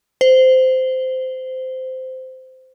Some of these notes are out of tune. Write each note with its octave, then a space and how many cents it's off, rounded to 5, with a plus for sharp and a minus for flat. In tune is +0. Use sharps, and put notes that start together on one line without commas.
C5 -15